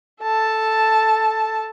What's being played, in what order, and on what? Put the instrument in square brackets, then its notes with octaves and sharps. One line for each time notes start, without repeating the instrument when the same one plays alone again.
[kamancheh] A4 A5